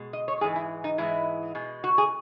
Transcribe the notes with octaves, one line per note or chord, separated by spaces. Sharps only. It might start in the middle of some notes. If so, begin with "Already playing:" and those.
Already playing: B2 G#3
D#5
C#5
G#2 E3 G#3 G#4
E4
D#4
G#2 E3 G#3 E4
B2 G#3
F#4
G#4